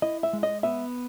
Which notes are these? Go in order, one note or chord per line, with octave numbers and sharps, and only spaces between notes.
E4 D#5
E5
G#3
D#5
B3 E5